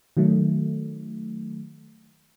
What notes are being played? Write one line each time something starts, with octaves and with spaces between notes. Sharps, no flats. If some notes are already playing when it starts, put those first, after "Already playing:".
D#3 F#3 A3